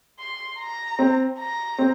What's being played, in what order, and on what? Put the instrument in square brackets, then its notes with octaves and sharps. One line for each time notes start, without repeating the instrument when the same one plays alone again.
[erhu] C6
A#5
[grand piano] C4
[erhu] A#5
[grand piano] C4